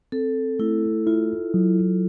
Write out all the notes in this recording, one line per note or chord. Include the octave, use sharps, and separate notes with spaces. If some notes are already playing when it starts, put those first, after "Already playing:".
C4 A4
A3 E4
E4 F4
F#3